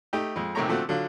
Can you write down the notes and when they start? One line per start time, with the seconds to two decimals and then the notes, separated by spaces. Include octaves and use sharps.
0.13 A3 D#4 G4
0.36 F2 G#3
0.55 A#1 C3 D#3 A3 C#5 A#5
0.68 D3 F3 A3 C4 F#4
0.89 D3 F#3 F4